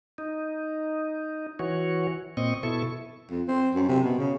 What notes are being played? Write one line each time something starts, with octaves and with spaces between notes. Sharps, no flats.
D#4
E3 F#4 C#5
A#2 C4 D#5 C#6
B2 E4 A4 C#6
F2
C4
F#2
C3
B2
C#3